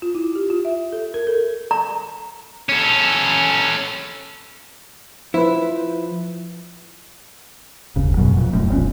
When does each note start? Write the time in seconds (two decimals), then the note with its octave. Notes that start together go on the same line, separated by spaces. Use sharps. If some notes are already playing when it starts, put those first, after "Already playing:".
0.02 F4
0.15 E4
0.35 G4
0.50 F4
0.65 E5
0.92 A4
1.14 A#4
1.27 A4
1.71 A#5
2.69 C#4 A4
5.34 F3 E4 B4 C5
7.96 F#1 D#2 C#3
8.17 F#2 B2 F#3
8.37 F2 A#2
8.53 D#1 F#2 A2
8.69 D#1 B1 F2 C#4